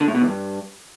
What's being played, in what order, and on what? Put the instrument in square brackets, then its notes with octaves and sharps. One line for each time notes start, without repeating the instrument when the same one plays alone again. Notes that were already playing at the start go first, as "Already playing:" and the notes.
[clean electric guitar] D3
A2
B2
E2
G2